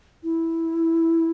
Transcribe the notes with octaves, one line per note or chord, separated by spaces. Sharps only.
E4